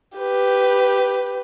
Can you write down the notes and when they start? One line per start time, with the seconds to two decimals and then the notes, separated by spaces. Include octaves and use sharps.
0.18 G4 B4